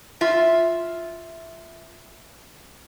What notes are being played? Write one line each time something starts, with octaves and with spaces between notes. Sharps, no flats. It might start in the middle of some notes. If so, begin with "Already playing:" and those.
F4 E5